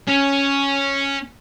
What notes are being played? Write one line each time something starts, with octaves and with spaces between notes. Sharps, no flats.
C#4